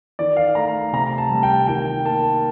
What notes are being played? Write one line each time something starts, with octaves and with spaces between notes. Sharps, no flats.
D#3 D5
F5
A3 A#5
C3 A#5
A5
G3
G5
D#3 G5
A#3 A5